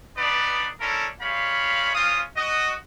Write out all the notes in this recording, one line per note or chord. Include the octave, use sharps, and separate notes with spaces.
B3 D4 D#4 B4 D5
C#4 D4 E4 A4 A#4
G3 G#3 C#5 F5 B5
C4 C#4 F4 F5 D#6
F#4 D#5